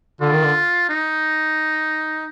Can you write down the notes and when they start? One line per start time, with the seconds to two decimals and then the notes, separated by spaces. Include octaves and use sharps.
0.21 D3 F4
0.32 D#3
0.43 D3
0.89 D#4